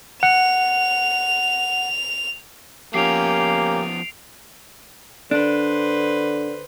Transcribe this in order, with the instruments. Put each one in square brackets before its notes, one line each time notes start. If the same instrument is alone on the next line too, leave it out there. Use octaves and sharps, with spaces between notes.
[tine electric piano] F#5 [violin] F7
[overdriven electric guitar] F3 B3 [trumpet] A#3 [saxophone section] C#4 G4 [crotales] C7 D7 F7
[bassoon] D3 [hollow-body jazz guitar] D4 [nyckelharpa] B4 C5